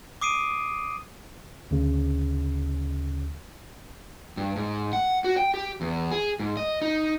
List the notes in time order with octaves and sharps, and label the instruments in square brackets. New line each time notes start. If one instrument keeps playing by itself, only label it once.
[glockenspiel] D6 D#6 C7 D7 D#7
[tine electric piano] D2 C#3
[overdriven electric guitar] G2
G#2
F#5
F#4
G5
G4
E2
G#4
G#2
D#5
D#4